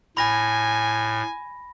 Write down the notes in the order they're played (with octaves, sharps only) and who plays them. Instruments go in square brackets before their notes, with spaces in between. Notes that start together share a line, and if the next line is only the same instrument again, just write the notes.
[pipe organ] A2 [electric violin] G#5 [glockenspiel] B5 A#6